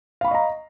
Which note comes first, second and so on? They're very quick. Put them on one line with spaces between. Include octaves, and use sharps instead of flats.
F5 B5 C#6 D#5 A#5